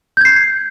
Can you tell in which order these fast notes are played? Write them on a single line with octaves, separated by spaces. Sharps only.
G6 G#6 C7